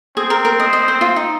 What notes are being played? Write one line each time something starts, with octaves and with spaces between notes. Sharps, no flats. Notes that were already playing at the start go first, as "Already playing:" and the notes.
C4 G#4
A#4
A#4
D#5
D#5
C5
F4
D#4